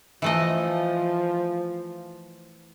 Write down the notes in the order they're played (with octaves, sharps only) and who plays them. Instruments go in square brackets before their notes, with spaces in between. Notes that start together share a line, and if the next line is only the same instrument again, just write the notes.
[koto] E3 A3 D#5 [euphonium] F3